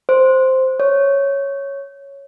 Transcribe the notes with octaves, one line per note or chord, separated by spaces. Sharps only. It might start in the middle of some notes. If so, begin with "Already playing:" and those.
C5
C#5